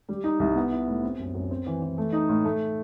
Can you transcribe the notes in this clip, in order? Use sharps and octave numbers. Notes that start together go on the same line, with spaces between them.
G3
D#4
C2
B3
E4
A2
C4
F#2
F#2
C4
E3
E3
A3
D#4
A2
A3